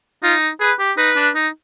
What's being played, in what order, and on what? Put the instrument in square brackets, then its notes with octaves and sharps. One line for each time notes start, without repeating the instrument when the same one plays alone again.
[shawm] D#4 [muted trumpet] F4
[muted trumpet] G#4 [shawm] B4
[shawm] G4
[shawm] D#4 [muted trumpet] B4
[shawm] D4
D#4